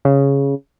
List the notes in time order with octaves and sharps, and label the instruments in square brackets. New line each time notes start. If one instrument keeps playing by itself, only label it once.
[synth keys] C#3